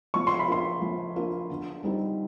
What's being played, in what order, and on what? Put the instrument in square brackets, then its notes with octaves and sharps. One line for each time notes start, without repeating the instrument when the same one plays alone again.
[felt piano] F3 [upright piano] C#6
[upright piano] C6
B5
[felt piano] A#3 D4 F4 [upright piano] C6
[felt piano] F3
A#3 D4 F4
D3
G3 C4 D#4 G4